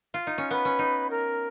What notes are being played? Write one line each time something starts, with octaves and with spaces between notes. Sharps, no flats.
F4
D#4
C#4
B3 B4
C#4
D#4
A#4